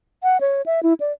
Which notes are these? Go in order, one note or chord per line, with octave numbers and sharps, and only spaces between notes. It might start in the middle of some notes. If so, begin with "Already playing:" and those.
F#5
C#5
E5
E4
D5